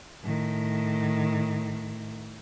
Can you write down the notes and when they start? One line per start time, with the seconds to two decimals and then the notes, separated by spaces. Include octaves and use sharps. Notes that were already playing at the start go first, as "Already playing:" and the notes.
0.24 A2 D#3